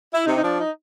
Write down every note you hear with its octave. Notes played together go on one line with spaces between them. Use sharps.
E4
C3 D#4
D#4
F3 D4
D#4